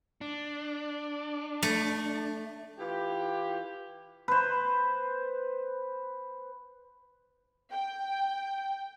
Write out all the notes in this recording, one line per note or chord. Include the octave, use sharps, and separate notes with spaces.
D4
A3
E3 E4 F4 G4
B4 C5
G5